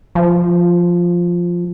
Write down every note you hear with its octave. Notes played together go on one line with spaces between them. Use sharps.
F3